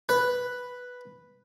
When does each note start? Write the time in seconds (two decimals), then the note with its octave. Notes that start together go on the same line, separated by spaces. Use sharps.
0.09 B4